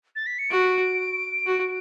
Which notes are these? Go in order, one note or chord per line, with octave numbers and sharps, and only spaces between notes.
A6
B6
C#7
F#4 D7
F#4